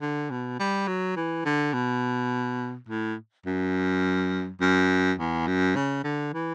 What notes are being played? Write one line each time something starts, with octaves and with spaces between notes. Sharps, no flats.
D3
B2
G3
F#3
E3
D3
B2
A2
F#2
F#2
E2
F#2
C#3
D3
E3